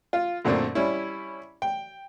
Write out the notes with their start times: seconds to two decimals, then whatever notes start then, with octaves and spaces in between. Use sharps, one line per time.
0.13 F4
0.45 F#2 A#2 D3 A3 C4
0.75 G3 C#4 E4
1.62 G5